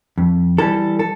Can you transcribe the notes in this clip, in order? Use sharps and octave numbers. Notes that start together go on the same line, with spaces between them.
F2
E3 G3 A4
A4